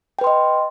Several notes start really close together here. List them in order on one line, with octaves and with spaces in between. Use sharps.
G5 B4 C6 D#5